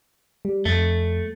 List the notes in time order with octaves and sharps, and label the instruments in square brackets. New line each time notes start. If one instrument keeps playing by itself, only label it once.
[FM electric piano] G3
[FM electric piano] F2 [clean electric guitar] A3